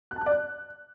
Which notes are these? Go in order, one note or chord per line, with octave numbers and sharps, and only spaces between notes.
F#6
A5
F#6
D5
F#6